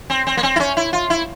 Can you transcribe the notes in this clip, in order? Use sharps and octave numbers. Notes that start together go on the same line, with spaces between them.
C4
C4
A#3
C4
E4
C#4
E4
F4
E4